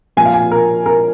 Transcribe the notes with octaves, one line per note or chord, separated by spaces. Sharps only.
A#2 F3 G#5
F5
G#5
A#4
A#4